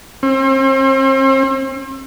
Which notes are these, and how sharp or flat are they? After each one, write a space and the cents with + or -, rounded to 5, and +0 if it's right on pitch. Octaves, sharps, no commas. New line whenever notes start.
C4 +40